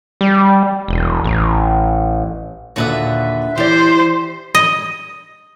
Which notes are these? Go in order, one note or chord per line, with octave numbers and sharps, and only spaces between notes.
G3
E1
A1
D#2 A#2 D3 F#4 B4 E5
E3 E4 G4 C5 D5
D#5